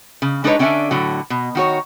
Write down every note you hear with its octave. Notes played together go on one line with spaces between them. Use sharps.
C#3
G#3 D4 D#4 A#4 B4 C#5
D3 C#4 D4 D#5 E5 G#5
A2 D3 F#3
B2
D#3 F#4 C#5